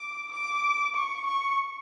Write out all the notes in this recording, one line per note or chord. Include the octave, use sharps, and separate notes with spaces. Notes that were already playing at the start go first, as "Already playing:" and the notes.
Already playing: D6
D6
C#6
C#6